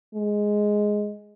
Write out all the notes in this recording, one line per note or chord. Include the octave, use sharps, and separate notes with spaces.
G#3